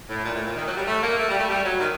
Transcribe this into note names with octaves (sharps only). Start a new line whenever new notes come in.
A2
A#2
A2
A#2
D#3
F#3
G3
A3
A#3
A3
G3
A3
G3
F#3
D#3